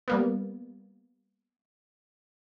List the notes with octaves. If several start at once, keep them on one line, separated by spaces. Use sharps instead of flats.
G3 A#3 B3